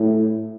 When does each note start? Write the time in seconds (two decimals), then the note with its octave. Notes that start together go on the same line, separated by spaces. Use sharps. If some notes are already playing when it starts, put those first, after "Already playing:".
Already playing: A2